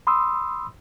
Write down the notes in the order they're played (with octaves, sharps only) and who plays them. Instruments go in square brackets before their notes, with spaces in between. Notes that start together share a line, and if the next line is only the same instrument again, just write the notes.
[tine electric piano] B5 C6 D#6 E6